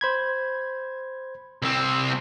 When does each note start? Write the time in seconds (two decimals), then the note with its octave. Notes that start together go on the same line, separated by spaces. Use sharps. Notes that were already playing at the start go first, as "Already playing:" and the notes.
0.01 C5 B5 G#6
1.62 C2 C4